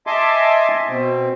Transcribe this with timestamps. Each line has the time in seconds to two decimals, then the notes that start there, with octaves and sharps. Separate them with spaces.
0.07 D#5 E5 G#5 A5 C6 D6
0.88 B2 C4